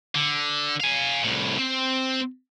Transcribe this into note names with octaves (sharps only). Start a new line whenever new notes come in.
D3
F5 G#5
C2 A2
C4